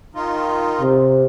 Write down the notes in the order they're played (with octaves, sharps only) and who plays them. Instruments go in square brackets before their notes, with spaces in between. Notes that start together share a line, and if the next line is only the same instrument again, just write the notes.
[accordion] D#3 D#4 F4
[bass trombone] C3